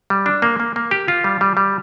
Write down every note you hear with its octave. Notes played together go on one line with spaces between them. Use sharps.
G3
D4
A#3
A#3
A#3
G4
F4
G3
G3
G3